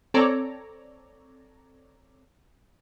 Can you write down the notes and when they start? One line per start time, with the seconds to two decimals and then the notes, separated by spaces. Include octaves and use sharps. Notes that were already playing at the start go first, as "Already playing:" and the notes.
0.14 C4 A4 C#5 D5 A#5